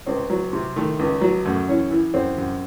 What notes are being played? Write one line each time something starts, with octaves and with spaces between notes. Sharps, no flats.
C#2 C4
F#3
C3
D#3 A3
C#2
F#3
F#2 A3
E3 C#4
E3
F#2 C4
F#2